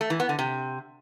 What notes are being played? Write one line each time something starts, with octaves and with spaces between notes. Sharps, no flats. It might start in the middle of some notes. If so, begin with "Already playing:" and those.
A3
E3
B3
D3
C3